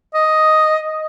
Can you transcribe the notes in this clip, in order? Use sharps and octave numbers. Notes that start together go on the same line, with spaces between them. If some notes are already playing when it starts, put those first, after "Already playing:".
D#5